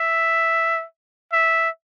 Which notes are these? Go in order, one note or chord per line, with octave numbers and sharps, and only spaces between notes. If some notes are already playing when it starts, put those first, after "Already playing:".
Already playing: E5
E5